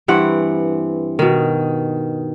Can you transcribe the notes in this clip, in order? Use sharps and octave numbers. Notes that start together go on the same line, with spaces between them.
G2 E3 C4 F#5
B2 D#3